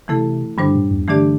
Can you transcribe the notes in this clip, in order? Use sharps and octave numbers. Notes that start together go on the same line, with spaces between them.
C3 E3 A3 E4 A4
G2 D3 G3 D4 C5
A2
E2
D3 E3 A3 D4 G4 D5